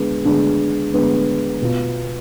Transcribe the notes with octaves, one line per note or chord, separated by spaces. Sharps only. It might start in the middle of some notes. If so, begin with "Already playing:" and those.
Already playing: D3 G#3 B3
D3 G#3 B3
D3 G#3 B3
B2 B3 F4